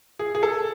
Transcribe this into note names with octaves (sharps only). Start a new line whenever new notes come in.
G#4
G#4
A4